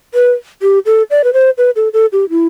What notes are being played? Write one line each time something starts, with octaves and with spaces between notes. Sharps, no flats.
B4
G4
A4
D5
B4
C5
B4
A4
A4
G4
E4